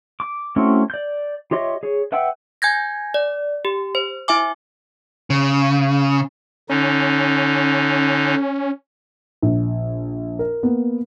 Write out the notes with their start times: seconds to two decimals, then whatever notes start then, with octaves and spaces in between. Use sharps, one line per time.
0.20 D6
0.56 A3 C4 C#4 E4 F#4
0.90 D5 G6
1.51 F4 G4 C#5 D#5 E5
1.83 G#4 C#5
2.12 B4 E5 F#5 G5 E6
2.62 G#5 G6 G#6 A#6
3.14 D5
3.65 G4
3.95 C5
4.28 E4 E5 G#5 D6
5.30 C#3
6.69 D3 C#4 D#4
9.42 A#1
10.39 A#4
10.63 A#3 B3